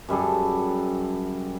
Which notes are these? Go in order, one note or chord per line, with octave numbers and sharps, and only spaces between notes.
F#2 G3 G#4 A4